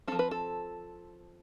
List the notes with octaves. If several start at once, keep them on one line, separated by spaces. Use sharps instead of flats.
F3 C4 A4
B4
A4